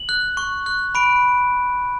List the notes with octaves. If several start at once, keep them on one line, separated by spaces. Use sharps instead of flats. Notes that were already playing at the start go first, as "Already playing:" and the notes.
Already playing: F#7
F#6
C#6
F#6
B5 D7